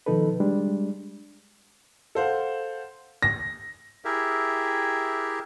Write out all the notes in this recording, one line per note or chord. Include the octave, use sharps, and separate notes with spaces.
B2 D#3 F3 D#4 A4 B4
G3 G#3 D4
A4 C5 F5 F#5
A#6
E4 G4 G#4 A#4 E5